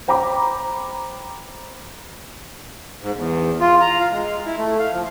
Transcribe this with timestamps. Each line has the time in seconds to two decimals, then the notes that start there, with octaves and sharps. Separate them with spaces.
0.08 C5 G5 A#5 B5 D6
3.02 G#2
3.16 E2
3.60 F4
3.81 A#5
4.00 F5
4.12 G#3
4.46 E4
4.58 A3
4.79 F5
4.92 F3